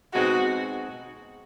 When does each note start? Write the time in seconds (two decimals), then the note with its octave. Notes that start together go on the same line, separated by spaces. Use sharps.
0.14 B2 G#3 C4 D#4 F#4